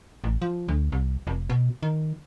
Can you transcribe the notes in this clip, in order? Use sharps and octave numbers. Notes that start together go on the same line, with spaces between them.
A1
F3
D2
C2
F1
B2
D#3